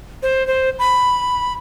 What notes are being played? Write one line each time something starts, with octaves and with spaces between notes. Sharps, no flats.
C5
C5
B5